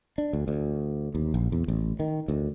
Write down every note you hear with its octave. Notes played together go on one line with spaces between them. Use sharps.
D4
D2
D2
D#2
A#1
E2
A1
D#3
D2